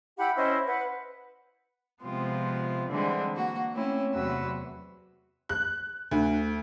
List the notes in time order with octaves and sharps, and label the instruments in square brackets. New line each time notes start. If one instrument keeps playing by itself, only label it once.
[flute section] E4 G4 F#5 B5
C#4 E4 C5 D#5
B4 F#5
[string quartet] C3 F3 G#3 B3 C4 F4
D3 E3 G3 G#3 C4 D4
A#3 F#4
A3 A#3 C4 C#4 E4
E2 C3 F#3 F#4 B4 E6
[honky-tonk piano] F#6
D2